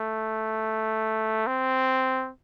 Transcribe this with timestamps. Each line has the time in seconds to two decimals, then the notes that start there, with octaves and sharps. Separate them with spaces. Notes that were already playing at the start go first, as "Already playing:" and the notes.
Already playing: A3
1.47 C4